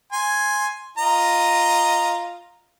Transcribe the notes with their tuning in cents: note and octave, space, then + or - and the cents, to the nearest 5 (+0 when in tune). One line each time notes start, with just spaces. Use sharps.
G#5 +0 C6 +5
F4 +0 D#5 +0 A#5 +0